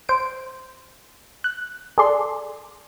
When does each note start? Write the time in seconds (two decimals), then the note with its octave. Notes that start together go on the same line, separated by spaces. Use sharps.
0.09 C5 D7
1.44 F#6
1.98 G#4 A4 D5 C6